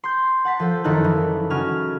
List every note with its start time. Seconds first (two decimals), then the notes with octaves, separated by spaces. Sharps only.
0.04 C6 G6
0.45 F#5 A5 B6
0.60 F3 A4 C5
0.84 F#1 D#3 D#4 E4 A4 F#6
1.04 E3
1.50 C#3 C#4 F#4 F6